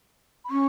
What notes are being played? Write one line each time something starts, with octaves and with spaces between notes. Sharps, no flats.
B5
C#4 C#6